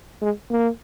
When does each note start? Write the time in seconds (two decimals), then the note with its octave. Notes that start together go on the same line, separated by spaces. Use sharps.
0.22 G#3
0.51 A#3